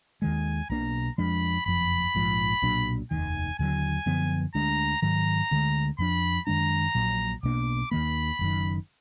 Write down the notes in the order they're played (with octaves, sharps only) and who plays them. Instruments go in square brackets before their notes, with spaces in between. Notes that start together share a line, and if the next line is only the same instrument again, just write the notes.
[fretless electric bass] D#2 D#3 G#3 [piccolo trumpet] G#5
[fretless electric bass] B1 B2 A#3 D4 [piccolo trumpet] A#5
[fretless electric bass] F2 F3 G#3 D4 [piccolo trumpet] B5
[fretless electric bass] F#1 F2 F3 [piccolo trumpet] B5
[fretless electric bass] A#1 G#2 F3
B1 A#2 F#3 D4
[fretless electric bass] F1 D#2 D#3 [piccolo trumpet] G#5
[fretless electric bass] D#2 D3 F#3 [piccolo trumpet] G#5
[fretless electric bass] F#2 D3 F3 B3
[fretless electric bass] D2 D3 G#3 D4 [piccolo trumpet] A#5
[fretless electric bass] G#2 D#3 F#3 [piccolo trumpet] A#5
[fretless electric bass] D2 D3 G#3
[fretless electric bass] F2 F3 G#3 D4 [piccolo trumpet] B5
[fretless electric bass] F#2 D#3 G#3 D4 [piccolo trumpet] A#5
[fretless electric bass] A#1 A#2 F#3
[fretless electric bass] B1 B2 A#3 D4 [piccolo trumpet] D6
[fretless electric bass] D#2 D#3 A#3 [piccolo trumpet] B5
[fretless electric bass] F#1 F#2 D#3